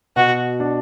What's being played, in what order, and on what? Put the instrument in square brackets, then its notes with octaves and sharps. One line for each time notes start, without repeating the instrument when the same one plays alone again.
[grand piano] B2 [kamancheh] F#4
[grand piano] D4